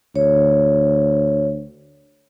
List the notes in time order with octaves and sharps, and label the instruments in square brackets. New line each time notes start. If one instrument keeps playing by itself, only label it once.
[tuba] D2 [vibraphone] C#5